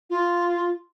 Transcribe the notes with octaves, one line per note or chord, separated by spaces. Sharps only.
F4